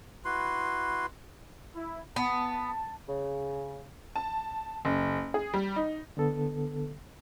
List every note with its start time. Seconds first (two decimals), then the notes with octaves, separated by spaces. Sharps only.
0.25 E4 F#4 B4 C6
1.75 E4
2.16 B3 A5
3.09 C#3
4.16 A5
4.85 F#1
5.34 G#4
5.54 G3
5.76 D#4
6.17 D3 B3 A4